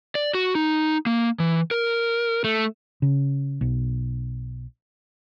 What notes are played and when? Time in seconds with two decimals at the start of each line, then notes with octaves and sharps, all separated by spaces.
0.15 D5
0.34 F#4
0.55 D#4
1.06 A#3
1.40 E3
1.71 A#4
2.44 A3
3.02 C#3
3.61 B1